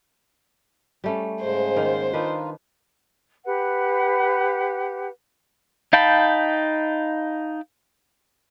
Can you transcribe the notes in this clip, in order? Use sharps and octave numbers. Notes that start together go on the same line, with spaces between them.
G3 A3 C#4
G#2 C#3 G#3 C5
D#3 A#3
D#3 D4 D#4 F4 B4
G4 B4 F#5
D#4 F5 G5 A5 B5